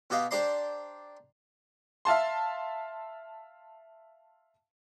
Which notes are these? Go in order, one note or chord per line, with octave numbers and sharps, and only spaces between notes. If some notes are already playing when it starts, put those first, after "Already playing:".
B2 F#4 G4 D#5 F5
D4 G4 C5 D5 A#5 C6
E5 F5 A5 C6